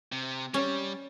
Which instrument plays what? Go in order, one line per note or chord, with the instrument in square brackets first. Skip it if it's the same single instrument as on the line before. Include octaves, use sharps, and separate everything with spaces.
[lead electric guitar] C3
[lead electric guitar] G3 [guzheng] C#4